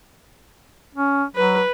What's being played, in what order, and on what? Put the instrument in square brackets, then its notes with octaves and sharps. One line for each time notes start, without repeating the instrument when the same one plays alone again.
[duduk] C#4
[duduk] F#3 [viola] B4